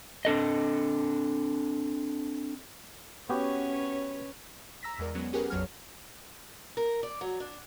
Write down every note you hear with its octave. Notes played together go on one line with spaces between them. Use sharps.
C4 D4 A4 D#5
B3 C#4 F#4 G4 B4 C#5
A#5 E6 A#6 B6
E2 G#3 A#4 D5
F#3 G#3 B3 C#4
C#4 G4 G#4 A#4 B4 F#5
A#1 F2 F#3 G#4 C#5 F6
A#4
D5
F#3
D4